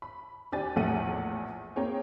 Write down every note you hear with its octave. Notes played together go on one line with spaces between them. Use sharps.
B5
D#2 D4 G4 D5 G#5 A6
A#1 E2 A2 A3 F#5 D#7
A#3 C4 G#4 C#5 G5